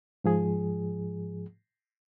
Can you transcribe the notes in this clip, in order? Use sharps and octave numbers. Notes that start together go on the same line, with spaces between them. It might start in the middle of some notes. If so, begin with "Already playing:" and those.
G#2 F3 G#4